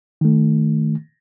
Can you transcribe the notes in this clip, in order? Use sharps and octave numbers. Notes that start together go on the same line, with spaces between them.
D#3 A3